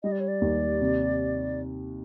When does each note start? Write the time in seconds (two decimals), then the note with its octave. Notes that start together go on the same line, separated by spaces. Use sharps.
0.03 G3 D#5
0.12 D5
0.20 C#5
0.28 D5
0.41 D#2
0.81 C3